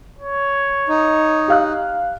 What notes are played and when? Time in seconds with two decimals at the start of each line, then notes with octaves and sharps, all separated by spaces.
0.18 C#5
0.89 D#4
1.48 G4 F5 F#6